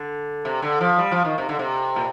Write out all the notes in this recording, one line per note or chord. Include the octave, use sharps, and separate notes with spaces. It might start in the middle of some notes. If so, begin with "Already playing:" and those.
Already playing: D3
C3
D3
F3
G3
F3
D#3
C3
D3
C3
A#2